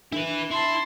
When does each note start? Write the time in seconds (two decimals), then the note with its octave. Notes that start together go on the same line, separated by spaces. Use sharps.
0.12 D4 E4 B4
0.51 E4 A5 C6